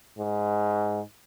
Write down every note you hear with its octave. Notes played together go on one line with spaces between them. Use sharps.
G#2